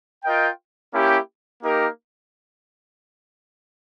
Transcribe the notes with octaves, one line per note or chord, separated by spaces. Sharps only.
F4 A#4 D#5 G5
A#3 C#4 E4 G4
A#3 D#4 G4 A#4